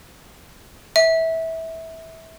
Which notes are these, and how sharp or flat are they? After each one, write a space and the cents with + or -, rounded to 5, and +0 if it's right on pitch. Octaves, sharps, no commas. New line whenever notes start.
E5 -20